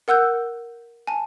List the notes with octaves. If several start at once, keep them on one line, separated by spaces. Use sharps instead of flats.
A#4 F#5 E6 F#6 G6
G#5 A5